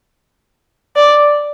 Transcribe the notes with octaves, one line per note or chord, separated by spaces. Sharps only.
D5